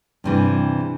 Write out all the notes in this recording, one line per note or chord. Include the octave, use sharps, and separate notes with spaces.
G2 C3 E3